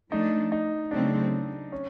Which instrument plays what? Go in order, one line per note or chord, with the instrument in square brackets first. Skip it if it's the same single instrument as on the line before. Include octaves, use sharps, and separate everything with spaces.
[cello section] F3 A3 D4 [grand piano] D#4
[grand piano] D#4
[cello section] C#3 F#3 A3 C4 [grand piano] D4
[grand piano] C#4